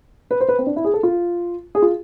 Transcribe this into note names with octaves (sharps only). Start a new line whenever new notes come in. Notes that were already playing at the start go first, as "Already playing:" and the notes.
B4
C5
B4
C4
D4
E4
G#4
A4
F4
G#4
F4